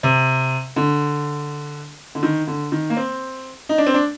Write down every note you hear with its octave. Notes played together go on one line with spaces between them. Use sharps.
C3
D3
D3
D#3
D3
D#3
A#3
C4
D#4
D4
C4
D4